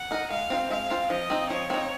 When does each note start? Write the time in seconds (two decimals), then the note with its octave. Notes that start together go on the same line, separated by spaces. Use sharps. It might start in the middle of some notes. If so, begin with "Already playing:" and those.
Already playing: F#5
0.11 D#4 A#4 D#5
0.30 G#3 F5
0.50 C4 F4 C5
0.70 G#3 F5
0.90 C4 F4 C5
1.10 F3 D#5
1.30 C4 D#4
1.50 F3 C#5
1.70 C4 D#4